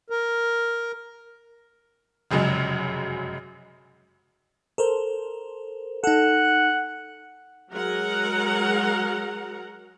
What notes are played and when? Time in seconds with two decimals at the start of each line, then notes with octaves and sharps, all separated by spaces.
0.10 A#4
2.31 F1 F#2 C#3 F#3 G#3
4.78 A4 A#4 C5
6.04 D#4 A4 F#5
7.71 F#3 G#3 F#4 A#4 F#5 A#5